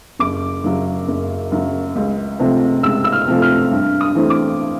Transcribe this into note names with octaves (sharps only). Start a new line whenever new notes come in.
F#1 D6
F#2 C#3 F#3
F#1
F#2 C#3 F#3
C#2
C3 F3 A3
C#2 E6
E6
F6
C3 F3 A3
F6
G2
D#6
E3 A3 C4
D6